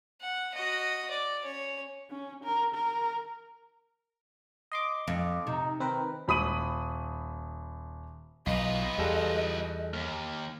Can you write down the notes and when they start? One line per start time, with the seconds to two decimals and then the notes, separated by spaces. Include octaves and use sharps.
0.21 F#5
0.54 F#4 D#5
1.10 D5
1.44 C#4 C#5
2.11 C#4
2.44 A#4
2.75 A#4
4.72 D#5 C6 D6
5.08 F2
5.47 C3 D#4
5.80 D#3 C4 A#4 B4
6.28 D#1 B5 D#6 D#7 F#7
8.47 B1 F4 B4 D#5
8.98 E2 G3 G#4 A4
9.93 D#2 F6